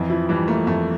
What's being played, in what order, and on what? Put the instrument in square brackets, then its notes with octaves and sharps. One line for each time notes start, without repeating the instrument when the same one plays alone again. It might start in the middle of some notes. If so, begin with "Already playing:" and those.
Already playing: [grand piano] F2 [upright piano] E3
[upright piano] F3 [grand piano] E4
[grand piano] E3 [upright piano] G3
[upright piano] A3 [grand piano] A#3
[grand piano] F2 [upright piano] A3